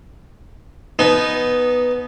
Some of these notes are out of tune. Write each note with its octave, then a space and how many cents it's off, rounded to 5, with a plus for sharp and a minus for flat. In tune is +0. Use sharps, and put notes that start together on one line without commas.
B3 +0 D#4 +0 A5 -45